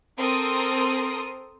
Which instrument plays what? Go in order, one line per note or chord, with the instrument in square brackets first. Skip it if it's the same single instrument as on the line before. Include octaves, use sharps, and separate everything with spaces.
[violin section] C4 A4 A#4 C6 D#6